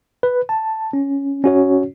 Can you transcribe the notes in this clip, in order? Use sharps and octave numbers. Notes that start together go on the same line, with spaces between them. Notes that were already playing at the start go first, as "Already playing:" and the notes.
B4
A5
C#4
C#4 F#4 C#5